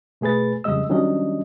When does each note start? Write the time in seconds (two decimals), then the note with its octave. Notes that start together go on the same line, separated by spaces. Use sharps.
0.21 B2 A3 G#4 B4 A6
0.64 F2 C#3 G3 G#3 D#5 E6
0.89 D#3 F#3 G3 C#4 D4 D#5